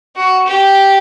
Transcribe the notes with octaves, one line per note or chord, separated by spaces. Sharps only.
F#4
G4